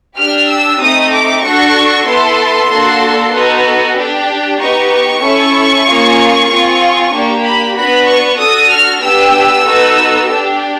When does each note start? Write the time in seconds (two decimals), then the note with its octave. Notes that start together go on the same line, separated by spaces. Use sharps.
0.17 D4 G4 F6
0.48 E6
0.80 A3 C4 D#4 D#6
1.12 D6
1.43 D4 F#4 A4 C#6
2.06 B3 E4 A4 C6
2.70 A#3 D4 F#4 A4
3.32 B3 D#4 F#4 A4
3.96 D4 G4
4.59 B3 D#4 G4 C#6
5.22 C#4 E4 A4
5.85 A#3 C#4 F4 G#4
6.49 C4 F4 G#4
7.12 A#3 D4 G4
7.44 B5
7.75 B3 D4 F#4 B5
8.07 C#6
8.38 D4 F#4 A4 D#6
8.70 F6
9.02 B3 D4 G4 E6
9.65 B3 D#4 F#4 A4
10.28 D4 G4